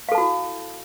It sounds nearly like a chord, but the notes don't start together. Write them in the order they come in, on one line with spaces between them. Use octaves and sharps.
F5 A4 A5 F#4 E4